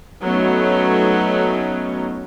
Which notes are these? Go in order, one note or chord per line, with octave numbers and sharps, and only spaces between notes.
F#3 A3 B3 C#4 D#4